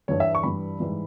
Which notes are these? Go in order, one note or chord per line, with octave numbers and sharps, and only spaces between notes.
G2 E3 G3 C#5
E5
C#6
G2 E3 G3 B5
G#2 E3 G3